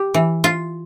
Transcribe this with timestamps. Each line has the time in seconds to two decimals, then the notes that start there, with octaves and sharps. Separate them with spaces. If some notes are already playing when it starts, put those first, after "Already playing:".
Already playing: G4
0.14 E3
0.44 F4